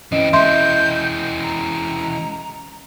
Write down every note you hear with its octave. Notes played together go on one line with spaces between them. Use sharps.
E3 C4 C#4 D#5 D7
E3 G#3 E5 C6 G6
A#5